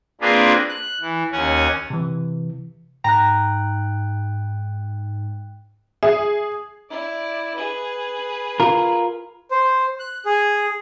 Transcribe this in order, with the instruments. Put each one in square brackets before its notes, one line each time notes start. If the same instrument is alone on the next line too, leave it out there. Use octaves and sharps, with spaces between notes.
[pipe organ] A#3 C4 D4 F4 G#4 B4
F#6
E3
D#2 C#4 F#5 G#5
[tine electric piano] C3 E3
[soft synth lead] G#2 [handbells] G5 F#6 [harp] A#5
[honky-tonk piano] G#4 [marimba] E5
[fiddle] E4 D5
G#4 B4
[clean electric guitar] F4 A#4
[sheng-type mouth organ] C5
F#6
G#4